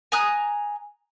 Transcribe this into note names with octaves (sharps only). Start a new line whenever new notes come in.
G#5 A#5 D#6 F#6